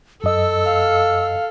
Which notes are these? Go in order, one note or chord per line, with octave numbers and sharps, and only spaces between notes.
F#2 A4 D#5 E6
F5